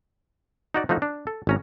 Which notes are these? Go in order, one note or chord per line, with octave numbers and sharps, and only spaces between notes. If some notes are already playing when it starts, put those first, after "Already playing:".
D#4 F#4 D5
F3 A3 D#4 F#4
D4
A4
G#1 C#4 A#5